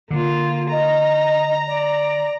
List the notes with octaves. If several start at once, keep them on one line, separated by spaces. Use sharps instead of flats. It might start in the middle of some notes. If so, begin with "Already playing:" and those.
D3 A#3 F4
D#5 A#5
D5